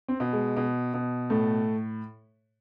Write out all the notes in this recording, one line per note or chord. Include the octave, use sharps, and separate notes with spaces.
C4
B2
G#3
B2
B2
A2 A3